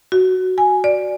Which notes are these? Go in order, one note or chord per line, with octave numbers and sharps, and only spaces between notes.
F#4
G#5
D5